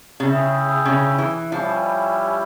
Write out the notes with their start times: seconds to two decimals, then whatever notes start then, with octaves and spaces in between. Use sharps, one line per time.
0.20 C#3 E4 G#4 E5 G5
0.85 C#3
1.18 E3
1.52 F3 G3 C#4 E4 G4